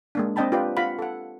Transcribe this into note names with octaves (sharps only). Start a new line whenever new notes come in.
G#3 A#3 D4
C4 D4 D#5 G5 A5 B5
F4 G4 B4 D5 G5
F4 F5 F#5 B5
A4 F#5